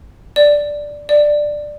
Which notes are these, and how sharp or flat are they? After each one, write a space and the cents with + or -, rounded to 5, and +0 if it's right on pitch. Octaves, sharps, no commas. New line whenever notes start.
D5 +0
D5 +10